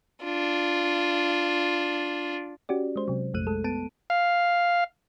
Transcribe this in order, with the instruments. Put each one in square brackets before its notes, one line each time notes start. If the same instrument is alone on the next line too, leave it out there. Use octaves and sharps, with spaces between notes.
[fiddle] D4 F4
[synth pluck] C#4 F#4 G4 D5
G#3 C5
C3 F#3
A#1 F2 A3 F#6 D#7
G#3 A4
B3 A5 D7 D#7
[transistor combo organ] F5